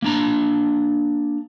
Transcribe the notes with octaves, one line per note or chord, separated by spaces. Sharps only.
A#3 D4 A#5